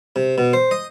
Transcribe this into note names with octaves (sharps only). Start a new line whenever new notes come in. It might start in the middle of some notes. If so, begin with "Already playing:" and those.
C3
B2
C5
D#5